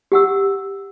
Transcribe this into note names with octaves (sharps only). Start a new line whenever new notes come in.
G4 F#5 E6